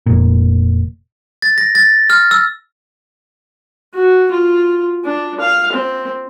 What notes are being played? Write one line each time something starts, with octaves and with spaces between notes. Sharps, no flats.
F1 A#2
A6
A#6
A6
F6
E6
F#4
F4
D4
F5
C4